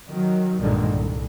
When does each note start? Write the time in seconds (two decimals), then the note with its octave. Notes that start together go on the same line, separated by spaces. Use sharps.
0.10 D#3 F#3
0.59 B1 G2 A#2 D3 D#3 G#3
0.92 C2